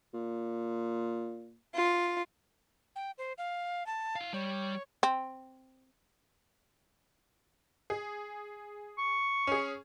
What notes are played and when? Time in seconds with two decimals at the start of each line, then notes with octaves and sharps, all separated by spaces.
0.14 A#2
1.75 F4
2.96 G5
3.18 C5
3.38 F5
3.86 A5
4.16 E4 F5
4.34 G3 C#5
5.03 C4
7.90 G#4
8.99 C#6
9.47 C#4 G#4